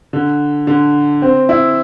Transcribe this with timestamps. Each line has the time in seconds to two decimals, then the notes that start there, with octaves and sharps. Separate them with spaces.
0.13 D3
0.67 D3
1.22 C4
1.49 E4